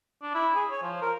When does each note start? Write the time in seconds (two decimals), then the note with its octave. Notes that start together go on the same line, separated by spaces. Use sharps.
0.22 D4
0.34 E4
0.55 G#4
0.70 C#5
0.83 F3
1.02 A#4